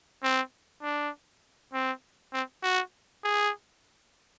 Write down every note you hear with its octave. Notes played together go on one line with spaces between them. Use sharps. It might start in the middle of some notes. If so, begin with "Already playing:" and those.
C4
D4
C4
C4
F#4
G#4